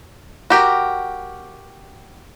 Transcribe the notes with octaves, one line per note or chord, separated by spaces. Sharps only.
F#4 G4 A#4